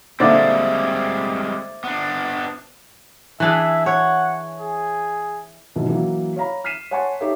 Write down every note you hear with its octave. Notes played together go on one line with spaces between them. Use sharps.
A#2 D3 G3 G#3 C4 C5 D5 E5
B3 D4
E3 D4 G#4 E5
C#5 F#5
G#4
G#2 B2 D#3 E3 F#3
E3 F#3 A#3
C#5 F5 A#5 B5
F6 B6 C7 D#7 E7
C#5 F#5 G#5 A5 C6 C#6
D#4 G4 A4 C#5 E5